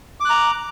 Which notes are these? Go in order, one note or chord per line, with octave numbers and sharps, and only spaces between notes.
A#5 D6 F#6